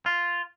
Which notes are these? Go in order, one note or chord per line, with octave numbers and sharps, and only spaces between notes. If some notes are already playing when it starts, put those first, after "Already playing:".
F4